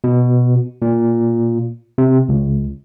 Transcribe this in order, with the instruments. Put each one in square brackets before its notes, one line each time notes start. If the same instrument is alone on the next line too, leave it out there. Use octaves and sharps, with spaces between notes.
[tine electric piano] B2
A#2
C3
C#2